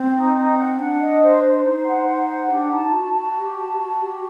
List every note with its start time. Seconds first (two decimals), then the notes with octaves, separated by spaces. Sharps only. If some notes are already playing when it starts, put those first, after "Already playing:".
Already playing: C4
0.15 D#4
0.37 D#4
0.57 F#5
0.79 D4 F#5
1.01 D#5
1.22 C5
1.43 C5
1.65 D#4 C5
1.86 F#5
2.08 C5
2.29 F#5
2.50 D4 G4
2.71 D#4 A5
2.93 F#4 A5
3.14 F#4 A5
3.36 G4
3.58 A5
3.79 A5
4.00 G4